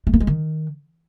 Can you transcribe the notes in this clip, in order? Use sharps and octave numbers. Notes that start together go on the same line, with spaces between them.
A3
A#3
G#3
D#3